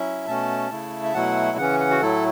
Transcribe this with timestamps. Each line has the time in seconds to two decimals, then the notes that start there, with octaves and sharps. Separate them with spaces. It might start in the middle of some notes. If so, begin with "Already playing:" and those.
Already playing: F#3 C#4 E4 E5
0.27 B2 A3 C#4 A5
0.71 C#3 A3 E4
1.04 E5
1.14 B2 F#3 A3 E4 F#5
1.58 C#3 E3 C#4 F#5
1.80 F#5
1.91 F#4
2.01 A2 F#3 A3 E4 A4